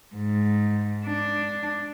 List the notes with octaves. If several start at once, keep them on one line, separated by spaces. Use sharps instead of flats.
G#2
D4